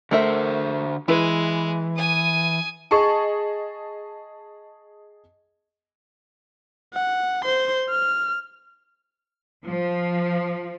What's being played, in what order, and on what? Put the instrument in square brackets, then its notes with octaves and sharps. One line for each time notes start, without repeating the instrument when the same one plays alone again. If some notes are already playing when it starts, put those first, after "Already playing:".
[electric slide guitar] D3 C5 [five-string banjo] A3 A#4 E5
[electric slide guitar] E3 [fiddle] G#3 [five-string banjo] E4 B4
[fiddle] G#5 D#6
[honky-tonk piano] G#4 D#5 A5 C#6
[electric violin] F#5
C5 C6
F6
[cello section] F3